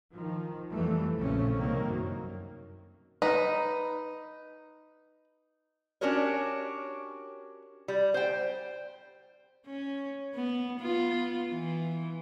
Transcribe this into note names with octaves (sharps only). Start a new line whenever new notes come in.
D#3 F3
F2 E3 G3 A3
A#1 C#3 A3 C4 C#4
C2 D#3 A#3
F#2
D#4 B4
C#4 D4 F#4 G4 A#4 C#5
G3
C5 G5
C#4
B3
B3 F4
E3